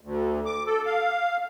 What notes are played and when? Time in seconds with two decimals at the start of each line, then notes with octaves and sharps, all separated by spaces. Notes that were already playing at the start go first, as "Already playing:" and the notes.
0.01 D2
0.46 D6
0.66 A4
0.86 F5